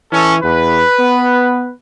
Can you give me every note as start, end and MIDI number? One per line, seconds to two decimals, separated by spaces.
0.12 0.41 52
0.12 0.34 61
0.12 0.34 69
0.43 0.83 40
0.43 1.72 71
0.99 1.71 59